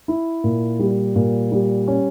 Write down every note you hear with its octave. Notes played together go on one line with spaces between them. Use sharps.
E4
A#2
G3
A#2
G3
C#4